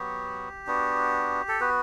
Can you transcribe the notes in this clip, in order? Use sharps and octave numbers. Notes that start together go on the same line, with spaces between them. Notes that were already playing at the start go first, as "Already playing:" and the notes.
Already playing: F#3 B3 F#4 G4
B3 D4 F#4
A4
B3 F#4 B4